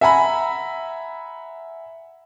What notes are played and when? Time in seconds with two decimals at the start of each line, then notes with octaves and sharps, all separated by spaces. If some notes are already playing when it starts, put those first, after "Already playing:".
0.01 E5 F#5 G#5 A#5 B5